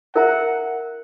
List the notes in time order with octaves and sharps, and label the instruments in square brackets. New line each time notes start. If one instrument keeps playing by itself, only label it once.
[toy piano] E4 A#4 E5 A#5 [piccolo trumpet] F#5